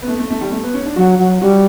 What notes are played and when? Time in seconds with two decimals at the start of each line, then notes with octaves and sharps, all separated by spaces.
0.02 B3
0.08 A3
0.19 A3
0.30 A3
0.41 G3
0.52 A3
0.64 B3
0.74 C#4
0.86 D4
0.96 F#3 F#4
1.19 F#3
1.41 G3 F#4